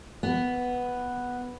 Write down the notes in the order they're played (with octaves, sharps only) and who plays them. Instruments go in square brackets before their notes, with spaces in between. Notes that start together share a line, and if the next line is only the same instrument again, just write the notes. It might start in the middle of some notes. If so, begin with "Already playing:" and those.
[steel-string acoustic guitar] B3